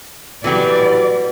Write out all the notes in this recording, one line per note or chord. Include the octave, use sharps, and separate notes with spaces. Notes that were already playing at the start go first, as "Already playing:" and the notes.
B2 E3 F#3 G3 A3 D5